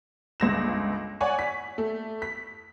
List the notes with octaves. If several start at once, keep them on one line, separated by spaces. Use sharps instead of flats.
G1 C#2 A#6 E7
C#5 D5 F#5 G#5
B6
A3
B6